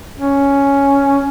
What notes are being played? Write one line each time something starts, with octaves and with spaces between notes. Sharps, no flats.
C#4